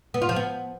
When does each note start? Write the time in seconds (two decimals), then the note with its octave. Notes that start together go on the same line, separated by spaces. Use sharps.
0.14 B3
0.22 F4
0.29 F3
0.36 B3